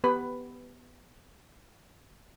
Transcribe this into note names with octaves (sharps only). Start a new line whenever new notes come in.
B3 G4 B4 B5